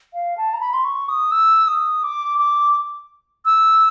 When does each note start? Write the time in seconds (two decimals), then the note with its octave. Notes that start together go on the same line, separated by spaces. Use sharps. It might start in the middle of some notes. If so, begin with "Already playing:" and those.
0.14 F5
0.37 A5
0.53 A#5
0.60 B5
0.73 C6
0.84 C#6
1.09 D#6
1.31 E6
1.67 D#6
2.03 D6
2.38 D6
3.45 E6